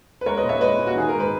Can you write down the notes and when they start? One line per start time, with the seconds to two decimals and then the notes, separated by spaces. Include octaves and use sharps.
0.21 B4
0.26 G#3 A#4 C#5
0.37 B4 D#5
0.43 A#2
0.49 C#5 E5
0.61 G#3 B4 D#5
0.79 A#2
0.87 F#4
0.96 D#3 G#4
1.09 G#2 A#4
1.20 B4